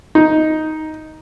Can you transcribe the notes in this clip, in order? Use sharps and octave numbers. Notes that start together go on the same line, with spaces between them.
D#4